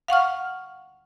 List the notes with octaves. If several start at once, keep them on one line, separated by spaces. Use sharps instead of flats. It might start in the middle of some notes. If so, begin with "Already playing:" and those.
F5 F#5 C#6 F6